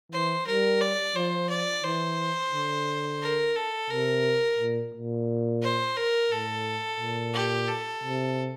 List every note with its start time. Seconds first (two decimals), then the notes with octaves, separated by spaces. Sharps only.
0.12 E3 C5
0.47 G3 A#4
0.81 D5
1.15 F3 C5
1.50 D5
1.83 E3 C5
2.52 D3
3.22 A#4
3.56 A4
3.90 C3 A#4
4.59 A#2
4.94 A#2
5.62 C5
5.97 A#4
6.31 A2 A4
7.00 A#2
7.34 G4
7.68 A4
8.04 C3